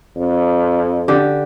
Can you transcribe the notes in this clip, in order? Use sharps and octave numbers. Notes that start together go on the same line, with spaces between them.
F2
D3 G4